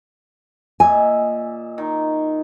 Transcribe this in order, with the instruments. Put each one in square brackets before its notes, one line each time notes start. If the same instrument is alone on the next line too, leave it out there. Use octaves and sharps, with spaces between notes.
[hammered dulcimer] A#2 D#5 E5 [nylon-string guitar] G#5
[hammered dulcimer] D#3